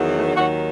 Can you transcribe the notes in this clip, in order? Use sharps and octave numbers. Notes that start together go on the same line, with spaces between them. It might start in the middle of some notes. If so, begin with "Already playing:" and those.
Already playing: E2 D#3 F#3
A3
D#2 D#3 F#3 F#4